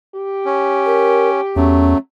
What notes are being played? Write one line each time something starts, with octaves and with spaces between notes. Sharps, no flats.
G4
C#4
A#4
E2 F#3 A3 C#4